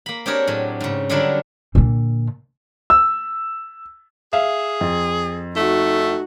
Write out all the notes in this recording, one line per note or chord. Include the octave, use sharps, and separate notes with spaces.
A#3 B5
C4 D4 G4 G#4 A#4 C#5
A2 F#3
G#2 C#3
D3 F#3 G3 D4 E4 A#4
A#2 D3
E6
G#4 E5 F5
F2
A3 D#4 F#4